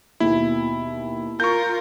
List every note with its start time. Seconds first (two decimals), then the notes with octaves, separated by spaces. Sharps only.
0.20 D#2 B2 E4
1.40 F4 A#4 C#6 G6